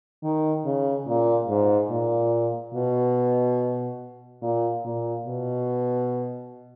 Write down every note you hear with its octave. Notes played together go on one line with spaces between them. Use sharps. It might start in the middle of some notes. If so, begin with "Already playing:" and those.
D#3
C#3
A#2
G#2
A#2
B2
A#2
A#2
B2